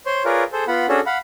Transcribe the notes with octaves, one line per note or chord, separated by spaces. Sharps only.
C5 C#5 C6
F4 G#4 A#4 B4 C#5 D5
G#4 A4 C5
B3 F4 F#5 B5
C#4 D4 F#4 G#4 A4
F5 F#5 B5